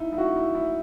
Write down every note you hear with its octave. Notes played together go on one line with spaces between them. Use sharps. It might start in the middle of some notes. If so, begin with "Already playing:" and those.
Already playing: D#4 E4
E4
F#4
E4
E4